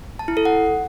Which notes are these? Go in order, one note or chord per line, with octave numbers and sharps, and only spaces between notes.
A5
E4
A4
F#5